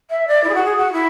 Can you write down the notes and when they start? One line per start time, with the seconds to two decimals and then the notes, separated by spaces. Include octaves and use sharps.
0.10 E5
0.27 D5
0.43 E4
0.49 G#4
0.54 F#4
0.65 G#4
0.76 F#4
0.92 E4